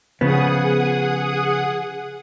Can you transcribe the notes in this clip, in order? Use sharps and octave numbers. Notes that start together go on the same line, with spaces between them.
C#3 F3 B3 G#4 F#5 D#6